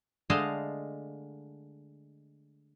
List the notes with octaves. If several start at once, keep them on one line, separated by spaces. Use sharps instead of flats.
D3 G#3 A3 D#5 F5 A5